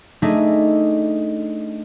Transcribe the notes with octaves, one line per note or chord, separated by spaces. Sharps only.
A3 D4 D#4 G#4 D#5